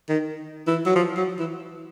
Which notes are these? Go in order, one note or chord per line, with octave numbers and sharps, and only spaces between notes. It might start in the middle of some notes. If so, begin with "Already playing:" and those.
D#3
E3
F#3
F3
F#3
E3